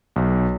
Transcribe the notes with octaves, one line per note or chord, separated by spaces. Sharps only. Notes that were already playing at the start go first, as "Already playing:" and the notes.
B1